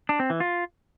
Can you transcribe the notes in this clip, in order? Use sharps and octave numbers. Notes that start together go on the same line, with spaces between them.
D4
C4
E3
F4